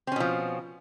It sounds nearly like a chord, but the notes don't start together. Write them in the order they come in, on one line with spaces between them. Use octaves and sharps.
C4 C#4 B2 F3